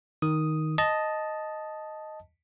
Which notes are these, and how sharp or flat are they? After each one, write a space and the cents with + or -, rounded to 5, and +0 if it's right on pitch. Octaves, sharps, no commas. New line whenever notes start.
D#3 +5 D#6 +0
D#5 +0 A5 -5